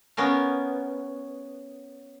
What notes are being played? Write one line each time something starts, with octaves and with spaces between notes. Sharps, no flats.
B3 C#4 A#4 F5